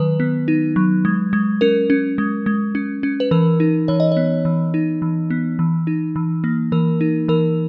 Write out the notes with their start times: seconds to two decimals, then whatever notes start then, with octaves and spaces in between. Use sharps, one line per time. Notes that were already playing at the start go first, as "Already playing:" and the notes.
Already playing: D#3 F#3 B4
0.20 B3
0.48 D#4
0.76 F#3
1.05 G#3
1.33 G#3
1.61 C#4 A#4
1.90 C#4
2.18 G#3
2.46 G#3
2.75 C#4
3.03 C#4
3.20 B4
3.31 E3 A#4
3.60 D#4
3.88 E3 C#5
4.00 D#5
4.12 B3 C#5
4.45 E3
4.74 D#4
5.02 E3
5.30 B3
5.59 E3
5.87 D#4
6.16 E3
6.44 A#3
6.72 E3 A#4
7.01 D#4
7.28 E3 A#4